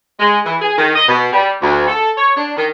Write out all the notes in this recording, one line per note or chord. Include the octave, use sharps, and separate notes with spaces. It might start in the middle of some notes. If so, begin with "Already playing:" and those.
G#3
E3
G#4
D#3
D#5
B2
G3
D2
A4
C#5
D4
D#3